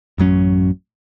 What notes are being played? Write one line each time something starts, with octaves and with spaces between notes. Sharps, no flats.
A1 F#2 F#3 C#4